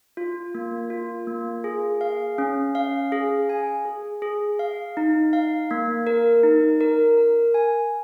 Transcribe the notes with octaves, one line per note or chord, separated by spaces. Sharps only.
F4
A#3
F4
A#3
G#4
F5
C#4
F5
G#4
G#5
G#4
G#4
F5
D#4
F5
A#3
A#4
D#4
A#4
A#4
G#5